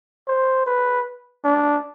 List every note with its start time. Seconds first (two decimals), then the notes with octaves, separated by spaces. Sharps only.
0.28 C5
0.66 B4
1.44 D4